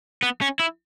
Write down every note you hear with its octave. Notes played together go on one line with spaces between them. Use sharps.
B3
C#4
E4